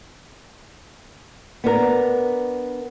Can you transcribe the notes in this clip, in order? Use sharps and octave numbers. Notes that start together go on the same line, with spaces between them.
B3 D4 A#4